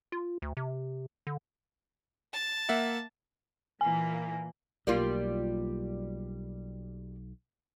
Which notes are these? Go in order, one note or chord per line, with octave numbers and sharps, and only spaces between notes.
F4
D2
C3
D3
A5
A#3 E5 F#5
A#2 E3 A#3 G#5
B1 G3 A#3 F4